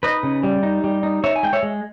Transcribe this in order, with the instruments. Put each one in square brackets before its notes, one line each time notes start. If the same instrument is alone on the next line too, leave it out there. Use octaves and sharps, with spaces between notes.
[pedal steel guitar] D#4 B4 D#5
C#3
G3
D#4
G3
D#4
D#4 C#5 E5
G#5
G#3 G5
C#5 E5
G#3